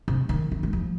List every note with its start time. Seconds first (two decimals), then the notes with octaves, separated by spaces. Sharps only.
0.08 C3
0.29 D#3
0.52 D#3
0.63 G#3
0.73 F3